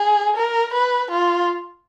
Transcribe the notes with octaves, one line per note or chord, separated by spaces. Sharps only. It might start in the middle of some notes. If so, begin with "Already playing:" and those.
Already playing: G#4
A#4
B4
F4